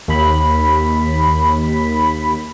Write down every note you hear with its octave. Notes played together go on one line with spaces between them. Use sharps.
D#2 B5